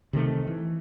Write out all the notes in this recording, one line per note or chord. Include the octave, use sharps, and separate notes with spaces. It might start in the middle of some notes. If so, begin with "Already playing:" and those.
C3 D#3 A3
E3